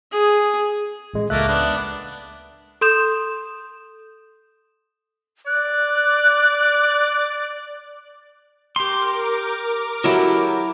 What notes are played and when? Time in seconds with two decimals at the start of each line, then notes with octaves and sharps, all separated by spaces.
0.13 G#4
1.14 A1 G#3
1.30 C#2 A3 A#3 E5 F#6
1.48 B3 D4
2.81 A4 C6 D#6 G6 E7
5.47 D5 F#6
8.76 G4 A#4 C6 D6
10.04 F#3 E4 G4 A4 A#4